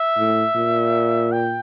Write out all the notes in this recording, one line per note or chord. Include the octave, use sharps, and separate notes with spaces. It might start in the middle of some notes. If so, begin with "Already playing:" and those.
Already playing: E5
A2
A#2
G5